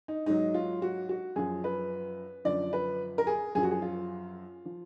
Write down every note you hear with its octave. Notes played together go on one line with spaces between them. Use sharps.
D#4
G#2 F#3 D#4
F4
F#4
F#4
F#2 F3 G#4
B4
F#2 D3 F3 D5
B4
A#4
G#4
F#2 F3 G#4
F#4
G#4
F4
F3